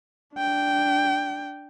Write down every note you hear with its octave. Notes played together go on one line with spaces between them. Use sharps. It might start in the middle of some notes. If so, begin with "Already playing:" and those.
D4 G5